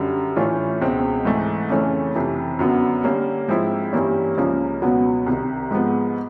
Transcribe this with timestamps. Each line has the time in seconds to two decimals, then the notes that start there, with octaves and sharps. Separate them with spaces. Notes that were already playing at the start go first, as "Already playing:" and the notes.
Already playing: F#2 D3 G3
0.36 A2 E3 A3 C#4 F4
0.81 C#2 B2 G#3 C4
1.25 G#2 E3 A3
1.70 F2 C#3 E3 A3 C#4
2.15 F2 C3 E3
2.59 F#2 D3 F#3 B3
3.04 D3 G3 A#3 C#4
3.48 G#2 F3 G#3 C4 E4
3.93 G2 E3 G3 A#3 C#4
4.37 C#2 C#3 F3 A#3 C#4
4.82 C#2 B2 F#3 B3
5.26 C2 C3 D#3
5.71 G#2 F3 G#3 B3